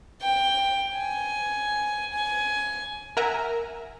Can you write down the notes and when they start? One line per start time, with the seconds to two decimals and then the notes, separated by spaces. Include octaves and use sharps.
0.22 G5
0.97 G#5
2.13 G#5
3.17 A#4 E5 F#5 G#5 A#5